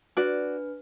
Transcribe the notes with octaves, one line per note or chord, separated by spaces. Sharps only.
D4 F#4 B4 D5